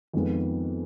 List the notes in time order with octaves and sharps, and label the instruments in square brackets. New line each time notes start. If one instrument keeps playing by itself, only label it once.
[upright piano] F2 D#3 G#3 B3 F4